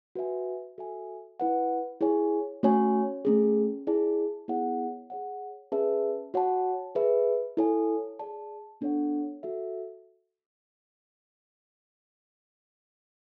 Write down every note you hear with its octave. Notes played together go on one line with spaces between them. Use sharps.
F#4 B4 E5 G#5
F#4 A4 E5 G#5
E4 B4 F#5
E4 G#4 C#5 G#5
A3 C#4 F#4 C#5 G#5
A3 C#4 G#4
E4 G#4 D5 A5
B3 E4 G#4 C#5 F#5
G#4 C#5 F#5
C#4 G#4 B4 E5 A5
F#4 C#5 F#5 A5
G#4 B4 E5
E4 A4 C#5 G#5
G#4 D5 A5
B3 D4 A4 C#5 F#5
F#4 A4 E5